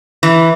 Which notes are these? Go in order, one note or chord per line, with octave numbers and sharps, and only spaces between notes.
E3